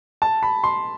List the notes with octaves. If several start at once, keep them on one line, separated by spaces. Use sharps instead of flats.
A5
B5
C6